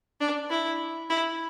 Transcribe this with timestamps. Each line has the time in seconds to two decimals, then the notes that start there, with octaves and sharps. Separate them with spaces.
0.21 D4
0.50 E4
1.10 E4